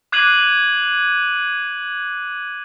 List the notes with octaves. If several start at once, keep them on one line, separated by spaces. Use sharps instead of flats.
D6 F#6 G#6 C7 D#7 F#7